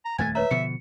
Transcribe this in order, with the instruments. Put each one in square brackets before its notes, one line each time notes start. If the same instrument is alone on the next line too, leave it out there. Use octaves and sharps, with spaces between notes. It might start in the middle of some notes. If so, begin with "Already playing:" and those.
[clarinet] A#5
[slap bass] D#1 F2 A3 [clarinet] G#5 [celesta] G#6 A6
[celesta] B4 C#5 A#5 [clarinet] E5
[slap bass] B2 D3 F3 [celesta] C#7